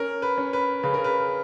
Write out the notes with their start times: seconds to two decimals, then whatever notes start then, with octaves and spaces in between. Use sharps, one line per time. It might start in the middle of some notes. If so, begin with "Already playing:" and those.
Already playing: C#4 A#4
0.22 B4
0.38 C#4
0.53 B4
0.83 C#3 B4
0.94 A#4
1.04 B4